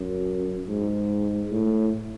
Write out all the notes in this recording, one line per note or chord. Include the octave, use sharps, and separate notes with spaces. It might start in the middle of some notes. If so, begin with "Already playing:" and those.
Already playing: F#2
G#2
A2